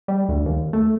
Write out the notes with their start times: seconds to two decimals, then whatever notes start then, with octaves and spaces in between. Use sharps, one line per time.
0.08 G3
0.29 D2
0.46 D#2
0.73 A3